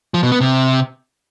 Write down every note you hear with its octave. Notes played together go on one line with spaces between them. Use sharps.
F3
B2
B3
C3